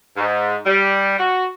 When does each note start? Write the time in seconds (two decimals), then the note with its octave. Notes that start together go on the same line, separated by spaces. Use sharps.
0.16 G#2
0.66 G3
1.18 F#4